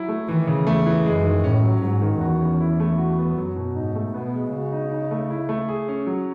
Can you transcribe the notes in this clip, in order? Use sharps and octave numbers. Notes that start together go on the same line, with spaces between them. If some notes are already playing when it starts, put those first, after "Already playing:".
Already playing: F#3 E4
A3
D#3 E3
C#3
E2 A3
E3
F#2 G#3
D#3
A2 C#4
F#3
G#2 F#3
D#3
E2 F#4
C#4
E4
A3
F#4
B3
F#2 F#3
B2
G#2 D#4
A3
B2 B3
G#3
C#3 F#4
D#4
D#4
A3
E4
A3
G#4
C#4
F#3